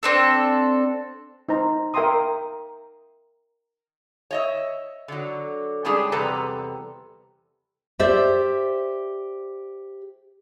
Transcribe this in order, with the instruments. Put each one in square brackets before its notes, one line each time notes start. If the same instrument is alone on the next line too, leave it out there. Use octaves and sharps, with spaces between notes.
[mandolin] C4 D4 A4
[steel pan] D#4 C5 A#5
A#4 E5 G5 A#5 C6 D#6
[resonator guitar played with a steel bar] C#5 D#5 E5
D3 F#3
G3 G#3 C#4 D4 G4 G#4
E2 C3 G3 A4 B4 A#5
[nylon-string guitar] G4 C5 D5 E5